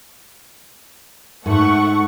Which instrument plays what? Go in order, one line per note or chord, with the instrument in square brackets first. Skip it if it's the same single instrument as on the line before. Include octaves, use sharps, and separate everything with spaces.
[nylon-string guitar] G#2 [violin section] A3 F#5 C#6